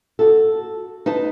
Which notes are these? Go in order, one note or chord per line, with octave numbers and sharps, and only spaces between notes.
F#4 A4
D#4 B4 A5